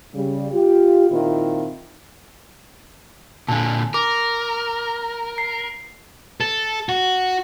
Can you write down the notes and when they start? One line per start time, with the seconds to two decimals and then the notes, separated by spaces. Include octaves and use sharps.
0.15 C#3 G3
0.53 F4 G4
1.09 A#2 D#3 C4 E4 F4
3.48 A#2 D3 G#5 A5
3.94 A#4 D6
5.38 C7
6.41 A4
6.89 F#4